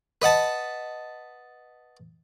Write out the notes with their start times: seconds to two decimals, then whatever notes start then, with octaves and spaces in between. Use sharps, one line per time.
0.22 B4 D#5 F#5 A5